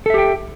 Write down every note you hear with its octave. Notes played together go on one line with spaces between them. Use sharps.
G4 A4 E5 G5